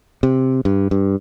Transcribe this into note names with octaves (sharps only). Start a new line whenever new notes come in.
C3
G2
G2